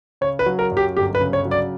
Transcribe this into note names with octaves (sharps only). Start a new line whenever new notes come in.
C#3 C#5
B4
F#3
A#4
F#2
G4
G1 G4
B4
C#3
C#5
F#3
D5